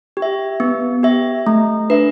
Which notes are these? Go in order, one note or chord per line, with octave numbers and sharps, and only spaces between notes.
G4
E5
B3
G4 E5
A3
D4 B4 E5